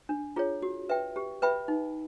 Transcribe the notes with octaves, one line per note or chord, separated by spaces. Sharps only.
D4
F4 G#4 C#5
F#4
B4 E5 G5
G4
B4 E5 G5 B5
D#4